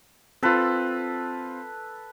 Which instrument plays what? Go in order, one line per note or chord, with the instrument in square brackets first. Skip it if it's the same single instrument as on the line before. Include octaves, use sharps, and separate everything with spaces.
[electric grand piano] C4 F4 [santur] A4 B4